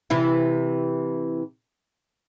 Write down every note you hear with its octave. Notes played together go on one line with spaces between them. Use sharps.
C3 E3 E4